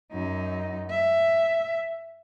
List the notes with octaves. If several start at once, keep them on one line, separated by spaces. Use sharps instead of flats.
F#2 D#4
E5